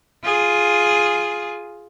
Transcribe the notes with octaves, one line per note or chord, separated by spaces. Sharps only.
F4 G#4